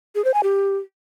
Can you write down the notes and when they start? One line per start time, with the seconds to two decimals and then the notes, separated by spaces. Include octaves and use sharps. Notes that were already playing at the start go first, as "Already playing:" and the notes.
0.15 G#4
0.25 C5
0.34 G#5
0.43 G4